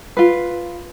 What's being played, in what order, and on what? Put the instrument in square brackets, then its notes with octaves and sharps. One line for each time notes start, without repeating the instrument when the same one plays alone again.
[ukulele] F4 B4